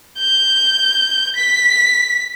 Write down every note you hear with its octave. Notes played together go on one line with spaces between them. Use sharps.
G6
B6